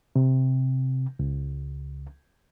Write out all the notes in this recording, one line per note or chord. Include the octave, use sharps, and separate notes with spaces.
C3
C#2